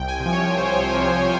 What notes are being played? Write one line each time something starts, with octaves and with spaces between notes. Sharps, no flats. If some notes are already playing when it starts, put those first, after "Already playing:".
Already playing: C2 G5
G#5
C3
F3
C#5
C2 C5
C3 F3